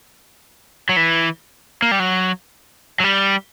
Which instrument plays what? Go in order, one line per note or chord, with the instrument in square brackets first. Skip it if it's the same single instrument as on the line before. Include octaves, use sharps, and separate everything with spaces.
[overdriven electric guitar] F#3
E3
A#3
G3
F#3
F#3
G3